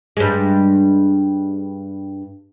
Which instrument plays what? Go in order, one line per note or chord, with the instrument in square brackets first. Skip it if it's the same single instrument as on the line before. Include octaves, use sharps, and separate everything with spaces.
[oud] G2 G#3